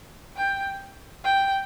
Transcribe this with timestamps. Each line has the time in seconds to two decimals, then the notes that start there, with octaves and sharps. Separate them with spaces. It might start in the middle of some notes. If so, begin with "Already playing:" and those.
0.36 G5
1.24 G5